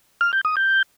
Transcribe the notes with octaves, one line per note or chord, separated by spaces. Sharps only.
F6
G6
D#6
G6